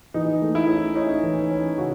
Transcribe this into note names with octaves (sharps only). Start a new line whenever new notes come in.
E3 D#4
A3
E4
C#4
C#4 D#4
E3
C#4
C#3 F#4